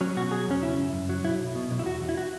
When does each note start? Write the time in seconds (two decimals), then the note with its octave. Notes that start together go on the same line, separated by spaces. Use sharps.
0.01 F#3 C#4
0.17 B2 F#4
0.31 F#3 G#4
0.47 E2 C#4
0.63 C#3 E4
0.79 F#2
0.93 F#2
1.09 F#3
1.25 B1 E4
1.40 B1
1.55 B2
1.71 B1
1.79 E4
1.86 E2 F#4
2.01 E2
2.09 E4
2.17 F#4